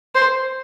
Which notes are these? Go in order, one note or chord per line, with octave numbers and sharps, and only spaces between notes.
C5